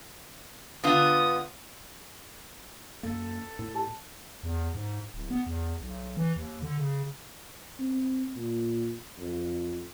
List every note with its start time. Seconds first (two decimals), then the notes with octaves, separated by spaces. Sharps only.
0.84 D3 B3 F4 D#6
3.03 F#2 A#3 A4
3.59 A2
3.75 G4 A5
4.43 E2
4.75 G#2
5.14 D1
5.31 B3
5.47 E2
5.82 B1
6.17 E3
6.36 D#2
6.62 D3
6.78 C#3
7.79 C4
8.36 A#2
9.19 F2